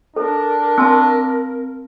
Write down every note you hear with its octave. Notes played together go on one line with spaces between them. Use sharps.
D4 A4 A#4
C4 A5 C6 E6